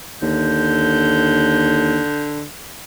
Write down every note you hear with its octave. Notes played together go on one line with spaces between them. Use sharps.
D#2 D3 G6